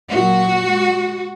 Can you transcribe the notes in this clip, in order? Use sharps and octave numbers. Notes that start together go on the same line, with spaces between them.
A#2 F#3 F#4
G#3